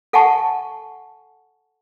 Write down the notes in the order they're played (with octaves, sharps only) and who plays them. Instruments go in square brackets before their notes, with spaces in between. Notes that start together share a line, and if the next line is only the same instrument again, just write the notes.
[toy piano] A4 F#5 G#5 A5 C#6